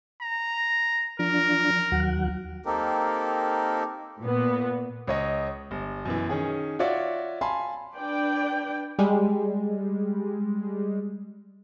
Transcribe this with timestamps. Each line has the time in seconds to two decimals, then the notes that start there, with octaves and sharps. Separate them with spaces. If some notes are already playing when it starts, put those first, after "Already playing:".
0.21 A#5
1.19 F3 D4 A#4
1.92 D#2 F#3 F#5
2.66 A#3 C4 D#4 G4 A4 A#4
4.21 A#2 B3
5.07 C#2 C#5 D#5
5.71 G1
6.05 F#2 B2 E3
6.29 D#3 C#4 G#4
6.79 F4 F#4 C#5 D5 E5
7.41 F5 G#5 A5 B5 C6
7.96 D4 B4 D5 G5
8.99 G3 G#3